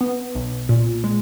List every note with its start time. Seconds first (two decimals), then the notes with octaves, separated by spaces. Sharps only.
0.01 B3
0.35 B1
0.69 A#2
1.04 G#3